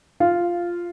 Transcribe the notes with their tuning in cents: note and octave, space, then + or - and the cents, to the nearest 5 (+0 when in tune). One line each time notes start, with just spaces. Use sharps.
F4 -5